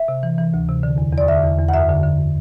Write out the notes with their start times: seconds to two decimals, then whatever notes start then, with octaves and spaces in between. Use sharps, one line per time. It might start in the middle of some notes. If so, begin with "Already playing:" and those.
Already playing: E5
0.08 C3
0.23 E3
0.38 E3
0.54 D2
0.69 C3
0.83 D3
0.98 E2
1.13 E2 D5
1.28 D3 E5
1.43 E2
1.59 E2
1.69 F#5
1.74 F#2 E5
1.89 D3
2.03 D3